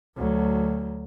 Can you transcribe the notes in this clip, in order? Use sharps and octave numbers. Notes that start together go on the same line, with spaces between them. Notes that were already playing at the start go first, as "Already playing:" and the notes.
D2 F#3